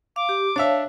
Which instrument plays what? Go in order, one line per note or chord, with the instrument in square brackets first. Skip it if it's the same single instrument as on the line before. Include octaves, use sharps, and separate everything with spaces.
[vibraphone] F5 [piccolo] D6
[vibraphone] G4
[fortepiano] D4 E5 [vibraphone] C#5 F5 A5